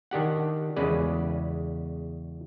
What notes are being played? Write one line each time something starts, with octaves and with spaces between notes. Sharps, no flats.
D#3 D4 G4 F#5
E2 C#3 G#3 B4 D5